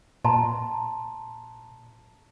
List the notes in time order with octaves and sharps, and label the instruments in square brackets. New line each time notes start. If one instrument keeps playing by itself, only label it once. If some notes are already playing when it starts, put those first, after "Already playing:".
[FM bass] A#2 [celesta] A5 A#5 C6